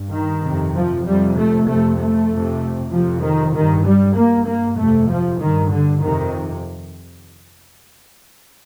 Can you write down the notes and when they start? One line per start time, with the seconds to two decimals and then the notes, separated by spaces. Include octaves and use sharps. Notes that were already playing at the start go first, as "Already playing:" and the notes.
Already playing: G2
0.12 D#3
0.43 F2 C3
0.74 F3
1.05 F2 C3 G3
1.36 A3
1.68 F2 C3 A3
1.99 A3
2.30 F2 C3
2.92 F2 C3 F3
3.23 D#3
3.54 G2 D#3
3.85 G3
4.17 G2 A#3
4.47 A#3
4.79 F2 C3 A3
5.09 F3
5.41 G2 D#3
5.71 D3
6.03 F2 C3 D#3